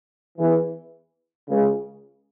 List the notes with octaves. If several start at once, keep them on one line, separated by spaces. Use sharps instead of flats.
E2 E3
C#2 C#3